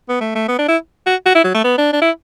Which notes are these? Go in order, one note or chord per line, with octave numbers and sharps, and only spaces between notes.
B3
A3
A3
B3
D4
E4
F#4
F#4
E4
F#3
A3
B3
D4
D4
E4